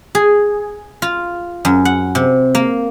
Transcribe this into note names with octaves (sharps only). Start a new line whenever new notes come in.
G#4
F4
F#2
F#5
C3
A#3